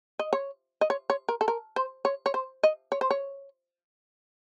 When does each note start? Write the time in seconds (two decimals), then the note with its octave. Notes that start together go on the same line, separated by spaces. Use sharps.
0.19 D#5
0.33 C#5
0.81 D#5
0.90 C#5
1.10 C#5
1.29 A#4
1.41 A4
1.48 A#4
1.76 C5
2.05 C#5
2.26 C#5
2.34 C5
2.63 D#5
2.92 C#5
3.01 C5
3.11 C#5